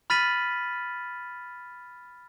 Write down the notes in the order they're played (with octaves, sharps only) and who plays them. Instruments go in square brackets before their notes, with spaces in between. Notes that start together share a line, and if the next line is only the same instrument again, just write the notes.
[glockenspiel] B5 F6 A6 B6 D#7 F#7